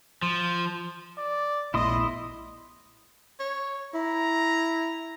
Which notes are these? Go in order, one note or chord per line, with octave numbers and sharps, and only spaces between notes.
F3
D5
A#1 A3 B3 E4 D#5 C6 D#6
C#5
E4 A#5